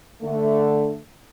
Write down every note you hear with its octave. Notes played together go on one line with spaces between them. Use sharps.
D3 A3